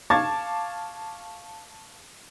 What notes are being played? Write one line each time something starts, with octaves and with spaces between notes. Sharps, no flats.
F5 A5 C#6 D6 G#6 A6